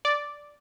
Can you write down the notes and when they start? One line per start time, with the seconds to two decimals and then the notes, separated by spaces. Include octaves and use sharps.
0.05 D5